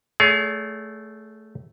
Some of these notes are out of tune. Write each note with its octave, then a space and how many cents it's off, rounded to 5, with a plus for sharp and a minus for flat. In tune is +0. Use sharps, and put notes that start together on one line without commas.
A3 +0 G#4 +15 C#5 +45